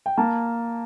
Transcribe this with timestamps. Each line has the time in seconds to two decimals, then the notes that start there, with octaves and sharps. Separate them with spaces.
0.06 G5
0.17 A#3 A5